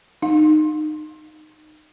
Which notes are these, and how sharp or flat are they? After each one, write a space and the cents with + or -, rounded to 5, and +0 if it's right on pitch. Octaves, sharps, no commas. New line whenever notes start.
D#4 -20